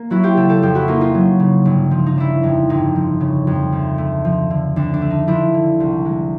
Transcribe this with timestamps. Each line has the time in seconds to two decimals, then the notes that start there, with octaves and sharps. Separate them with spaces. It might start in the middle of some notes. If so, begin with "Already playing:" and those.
Already playing: A#3
0.10 F#3 E4 F#4
0.23 F4 G4
0.37 C#3 G4 A4
0.49 G4 A4
0.62 F2 F4 G4
0.75 E4 F#4
0.88 A#3 D#4 F4
1.01 D#4 F4
1.14 F#3
1.39 C#3
1.65 G1
1.91 F3
2.06 D#4
2.16 C#3 D4 E4
2.43 F2 D#4
2.69 G1 D#4
2.96 F3
3.20 C#3
3.47 F2
3.72 D2
3.98 A3
4.25 F3
4.50 D3
4.76 D2 D4
4.94 D4
5.01 A3
5.10 D#4
5.27 F3 D4 E4
5.54 D3
5.80 C2
6.05 G#3